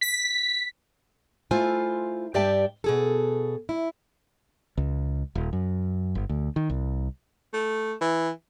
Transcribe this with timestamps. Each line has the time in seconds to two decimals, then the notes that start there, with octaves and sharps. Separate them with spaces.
0.01 B6
1.51 A3 E4 F4 C5 G#5
2.34 G2 G4 D5 E5 G5 A5
2.84 B2 G#4 A4
3.69 E4
4.77 C#2
5.35 D#1
5.53 F#2
6.15 G1
6.29 D2
6.56 D#3
6.70 C2
7.53 A3
8.01 E3